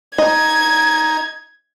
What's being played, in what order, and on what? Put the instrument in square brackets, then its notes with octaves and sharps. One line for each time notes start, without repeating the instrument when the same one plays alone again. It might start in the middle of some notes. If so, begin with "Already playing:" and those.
[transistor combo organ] D#4 [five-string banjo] D#5 [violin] G#6